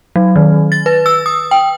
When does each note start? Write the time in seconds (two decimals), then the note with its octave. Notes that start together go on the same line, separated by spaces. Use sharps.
0.16 F#3
0.36 D#3
0.72 A6
0.86 B4
1.06 E6
1.26 D#6
1.51 G5